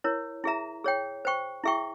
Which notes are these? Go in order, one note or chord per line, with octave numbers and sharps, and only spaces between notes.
E4 A#4 C#5
E4 G#4 E5 A#5
G#4 C#5 G5
C5 G5 C#6
E4 G#4 E5 G5 C#6